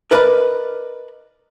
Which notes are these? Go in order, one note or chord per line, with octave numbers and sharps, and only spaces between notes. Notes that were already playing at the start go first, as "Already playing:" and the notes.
A#4 B4 D5 D#5 A5 B5